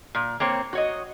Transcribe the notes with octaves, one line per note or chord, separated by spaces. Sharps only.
A#2
A#3 C4 C#5
F#4 C#5 D#5